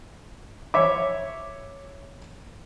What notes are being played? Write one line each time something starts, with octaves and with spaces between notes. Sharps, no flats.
C#5 E5 D6